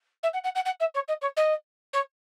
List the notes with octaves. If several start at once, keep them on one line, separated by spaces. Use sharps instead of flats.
E5
F#5
F#5
F#5
F#5
E5
C#5
D#5
C#5
D#5
C#5